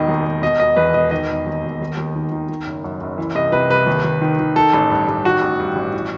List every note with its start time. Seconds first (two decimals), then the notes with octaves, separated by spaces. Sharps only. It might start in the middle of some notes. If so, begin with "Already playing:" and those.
Already playing: E1 D#3 D#5
0.08 D#2
0.25 E1
0.42 B2 D#5
0.60 E1 D#5
0.76 E2 B4
0.94 E1 D#5
1.11 D#3 D#5
1.29 E1
1.46 D#2
1.63 E1
1.80 D#2
1.97 D#2
2.15 D#3
2.32 D#3
2.49 D#3
2.66 F#1
2.84 F#2
3.01 F#1
3.18 E3
3.35 C2 D#5
3.52 C3 B4
3.70 C2 B4
3.86 D#2
4.04 D#2
4.21 D#3
4.39 D#3
4.56 D#3 A4
4.73 A1
4.90 G2
5.08 A1
5.25 D#3 F#4
5.42 A1
5.60 G2
5.76 A1
5.93 E3